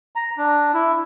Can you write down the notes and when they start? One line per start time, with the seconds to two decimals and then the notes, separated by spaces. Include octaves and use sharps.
0.16 A#5
0.37 D4
0.74 E4